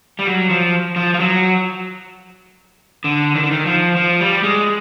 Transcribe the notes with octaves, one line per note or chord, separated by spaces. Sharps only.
G3
F#3
F3
F3
F3
F#3
D3
D#3
D3
D#3
F3
F3
G3
G#3